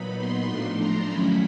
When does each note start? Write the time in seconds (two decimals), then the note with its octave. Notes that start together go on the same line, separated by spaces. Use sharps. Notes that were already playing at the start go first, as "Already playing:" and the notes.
Already playing: A#2 F#3 B3 D#4 B5
0.17 C6
0.47 A2 F3 A3 D4 C6
0.77 A#5
1.07 D#3 F#3 A3 C#4 E4 B5